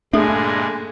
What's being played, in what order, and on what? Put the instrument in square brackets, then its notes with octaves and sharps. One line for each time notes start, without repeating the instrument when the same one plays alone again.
[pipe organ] G2 A#2 G#3 [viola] D3 G#5 [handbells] A3 G#4 [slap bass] D4